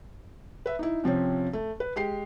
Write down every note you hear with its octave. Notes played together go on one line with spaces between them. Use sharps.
B4 E5
D#4 E4
C3 F3 C4 C#4
A3
B4
G#3 G4 C7